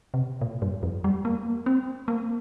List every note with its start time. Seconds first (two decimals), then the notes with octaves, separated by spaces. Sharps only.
0.14 C3
0.41 A#2
0.62 G2
0.83 F2
1.04 G3
1.25 A#3
1.66 C4
2.08 A#3